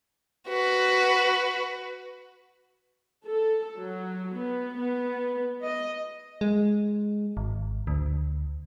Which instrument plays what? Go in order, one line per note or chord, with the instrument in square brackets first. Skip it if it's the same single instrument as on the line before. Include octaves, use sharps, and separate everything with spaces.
[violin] F#4 B4
[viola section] A4
F#3
B3
B3
D#5
[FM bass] G#3
G#1
D2